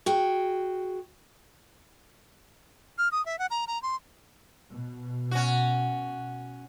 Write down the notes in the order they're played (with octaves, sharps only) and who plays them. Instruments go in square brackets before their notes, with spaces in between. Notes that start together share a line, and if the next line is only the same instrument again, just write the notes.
[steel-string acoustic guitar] F#4 G#4 G5
[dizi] F6
D#6
E5
F#5
A#5
A#5
C6
[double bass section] B2
[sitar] C#4 F#4